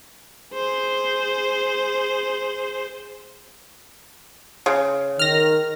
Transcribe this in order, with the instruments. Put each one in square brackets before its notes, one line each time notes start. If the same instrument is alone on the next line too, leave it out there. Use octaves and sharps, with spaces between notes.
[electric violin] G#4 C5
[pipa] C#3
[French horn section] D#3 [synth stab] F6 A#6